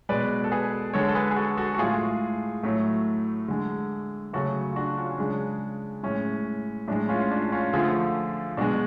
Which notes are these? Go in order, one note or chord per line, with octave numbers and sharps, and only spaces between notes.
B2 G#3 B4 D5
A4
G#4 B4
D3 G#3 A4 C#5
A4
G#4 B4
G#4
F#4 A4
F#4 A4
F#4
A2 G#3 F4 G#4
A2 F#3 A3
D3 G#3
C#3 F#3 A3 F#4 A4
F4
D4 F#4
C#4 F4
C#4
C#3 G#3 D4
A2 G#3 C#4
A2 G#3 D4
C#4 F4
F4
D4
C#4 F4
D3 F3 A3 F4 G#4
B2 G#3 D4 F#4